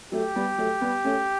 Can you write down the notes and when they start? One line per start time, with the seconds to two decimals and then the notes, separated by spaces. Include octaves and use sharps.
0.12 F#3 A3 G4
0.36 G3 B3
0.58 F#3 A3
0.81 G3 B3
1.04 A3 C#4